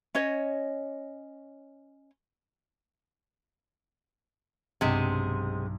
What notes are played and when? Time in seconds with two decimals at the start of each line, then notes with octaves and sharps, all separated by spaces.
0.15 C#4 C#5 D#5
4.81 B1 G2 C3 G#3 E7